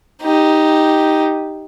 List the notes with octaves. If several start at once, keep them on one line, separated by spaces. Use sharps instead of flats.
D#4 G4